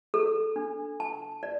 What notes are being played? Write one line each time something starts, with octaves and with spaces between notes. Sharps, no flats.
A4
D4
A5
D5